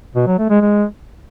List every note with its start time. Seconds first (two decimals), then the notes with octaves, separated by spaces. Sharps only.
0.15 B2
0.27 F#3
0.38 A3
0.50 G#3
0.61 G#3